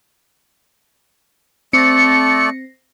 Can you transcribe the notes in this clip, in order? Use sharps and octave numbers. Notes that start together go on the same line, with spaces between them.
A3 C4 A4 D5 A#6 C#7